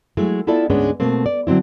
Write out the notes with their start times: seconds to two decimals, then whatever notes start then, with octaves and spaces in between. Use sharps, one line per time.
0.17 F#3 G#3 A3 E4
0.47 B3 E4 F4 A4 D5 E5
0.70 D2 G#2 G#3 B3 C#4 D4
1.00 B2 A3 A#3 C4
1.26 D5
1.47 D3 F#3 C4 E4